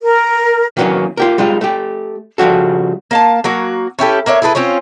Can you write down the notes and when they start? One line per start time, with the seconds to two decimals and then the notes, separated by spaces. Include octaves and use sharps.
0.02 A#4
0.77 D#3 E3 F#3 A3 A#3 C#4
1.17 F4 G4 A#4
1.38 G3 G#3 D#4 F4
1.61 A3 G4
2.38 C#3 F3 G3 F#4 A4
3.11 A#3 F5 A5
3.44 F#3 A#3 F#4
3.99 C#4 E4 G4 A4
4.26 A#3 D4 C#5 E5
4.42 E4 G#4 A4 B4
4.55 C4 C#4 F4 C#5